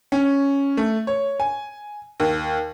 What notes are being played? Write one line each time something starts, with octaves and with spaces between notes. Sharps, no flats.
C#4
A3
C#5
G#5
D#2